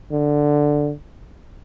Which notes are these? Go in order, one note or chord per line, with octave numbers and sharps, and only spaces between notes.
D3